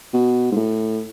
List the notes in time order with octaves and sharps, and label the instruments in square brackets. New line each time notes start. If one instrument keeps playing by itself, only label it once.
[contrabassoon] B2
G#2
A2